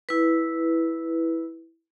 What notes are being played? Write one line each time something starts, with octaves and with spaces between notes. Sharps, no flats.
E4 B4